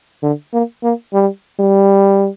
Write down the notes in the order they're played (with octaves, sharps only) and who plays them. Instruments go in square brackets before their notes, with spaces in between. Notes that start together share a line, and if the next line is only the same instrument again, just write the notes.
[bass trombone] D3
A#3
A#3
G3
G3